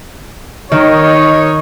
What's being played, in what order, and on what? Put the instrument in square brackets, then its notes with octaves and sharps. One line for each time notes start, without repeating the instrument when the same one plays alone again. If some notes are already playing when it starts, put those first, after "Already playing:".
[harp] D#3 [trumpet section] D#4 A#4 C#5